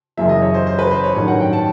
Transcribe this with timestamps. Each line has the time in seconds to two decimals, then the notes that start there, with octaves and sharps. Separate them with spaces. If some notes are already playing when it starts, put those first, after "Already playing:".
0.17 F#1 F#2 C#3 E3 E5
0.29 D#5
0.42 C#5
0.54 C5
0.67 C5
0.79 B4
0.91 C5
1.04 C#5
1.16 A1 G2 D#3 F#3 C#5
1.28 F#5
1.40 G5
1.53 A5